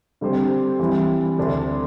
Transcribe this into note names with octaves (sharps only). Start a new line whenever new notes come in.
D3 G3 C4 G4 C5
E3 G3 C4
D2 D3 A3 D4